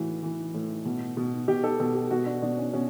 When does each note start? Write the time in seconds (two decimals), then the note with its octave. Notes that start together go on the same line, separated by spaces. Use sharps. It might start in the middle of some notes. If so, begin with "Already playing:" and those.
Already playing: A2 E3 F#4
0.23 E3
0.54 A2
0.85 B2
1.17 B2
1.48 B2 G4
1.64 A4
1.80 B2 A4
1.95 G4
2.10 B2 F#4
2.26 D4
2.42 B2 D4
2.58 C#4
2.73 B2 C#4